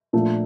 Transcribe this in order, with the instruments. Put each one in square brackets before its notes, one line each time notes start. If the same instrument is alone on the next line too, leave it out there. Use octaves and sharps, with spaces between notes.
[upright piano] A#2 F3 A3 D4